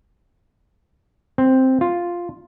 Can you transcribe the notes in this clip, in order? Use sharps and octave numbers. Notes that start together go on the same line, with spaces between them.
C4
F4